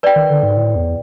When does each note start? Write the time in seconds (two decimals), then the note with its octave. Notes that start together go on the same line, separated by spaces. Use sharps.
0.03 B4 D5 G5
0.16 D#3
0.30 D3
0.43 G#2
0.57 A2
0.76 E2